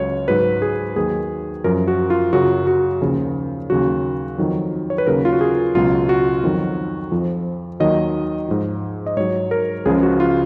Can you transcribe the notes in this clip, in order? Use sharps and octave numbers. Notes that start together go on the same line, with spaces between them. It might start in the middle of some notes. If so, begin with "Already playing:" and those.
Already playing: C#2 C#3 F#3 C#5
G#2 F#3 B4
G#4
D#2 D#3 F#3 G#4
F#2 F3 A#4
F#4
F4
F#2 C#3 F#3 F#4
F#4
D#2 C#3 F3
D#2 C#3 F#3 F#4
F2 D#3 F#3
C#5
B4
D#2 C#3 F#3 A#4
F4
F#4
G#4
C#2 B2 F#3 F4
F#4
F2 D#3 F#3
F2 F3
D#2 D#3 F#3 D#5
G#2 F3
D#5
G#2 F#3 C#5
A#4
C#2 C#3 F3 G#4
F#4
F4